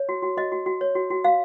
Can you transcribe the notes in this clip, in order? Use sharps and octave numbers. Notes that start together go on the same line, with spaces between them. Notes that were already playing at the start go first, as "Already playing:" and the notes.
Already playing: C#5
F#4
F#4
F#4 D#5
F#4
F#4
C#5
F#4
F#4
F#4 F5